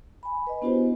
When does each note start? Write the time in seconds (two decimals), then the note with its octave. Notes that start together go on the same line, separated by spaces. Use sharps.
0.23 G#5 B5
0.47 B4 D#5
0.62 B3 D4 E4 F#4 G4 C5